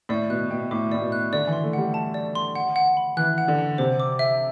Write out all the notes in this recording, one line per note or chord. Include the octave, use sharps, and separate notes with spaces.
A2 D5
B2 F#6
B2 G5
A2 D6
A2 D5
B2
F#6
D3 D5
E3
C6
A3
G3 F#5
A5
D5
C6
F#5
F#5
B5
E3 F#6
F#5
D3
F#5
C3 C5
D6
E5